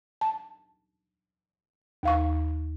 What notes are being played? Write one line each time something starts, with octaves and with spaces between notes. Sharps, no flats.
A5
D#2 F5 C#6